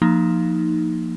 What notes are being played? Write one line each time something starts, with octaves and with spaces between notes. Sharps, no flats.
F3 A#3 D#4